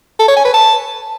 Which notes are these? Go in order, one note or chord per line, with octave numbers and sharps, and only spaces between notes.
A4
C#5
G#5
B4
A5